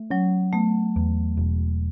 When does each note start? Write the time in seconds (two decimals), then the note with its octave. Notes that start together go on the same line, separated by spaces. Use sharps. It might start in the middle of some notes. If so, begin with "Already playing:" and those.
Already playing: A3
0.10 F#3 C#4
0.53 A3 B3
0.96 E2
1.37 E1